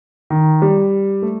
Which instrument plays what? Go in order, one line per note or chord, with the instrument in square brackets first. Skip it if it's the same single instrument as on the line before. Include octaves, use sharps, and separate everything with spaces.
[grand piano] D#3
G3
A3